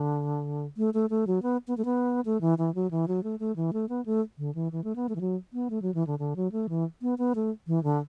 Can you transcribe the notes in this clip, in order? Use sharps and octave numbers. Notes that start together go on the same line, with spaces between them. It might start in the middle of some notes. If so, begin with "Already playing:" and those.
Already playing: D3
A3
A3
A3
F#3
B3
B3
A3
B3
A3
E3
E3
F#3
E3
F#3
A3
A3
E3
A3
B3
A3
D3
E3
E3
A3
B3
A3
E3
F#3
B3
A3
F#3
E3
D3
D3
F#3
A3
E3
B3
B3
A3
E3
D3